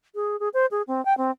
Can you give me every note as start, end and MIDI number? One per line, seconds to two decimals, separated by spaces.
0.15 0.39 68
0.40 0.49 68
0.54 0.66 72
0.71 0.82 68
0.87 1.04 60
1.05 1.16 79
1.17 1.31 60